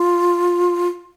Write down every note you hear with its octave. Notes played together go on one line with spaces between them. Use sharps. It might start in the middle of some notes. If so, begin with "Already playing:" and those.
Already playing: F4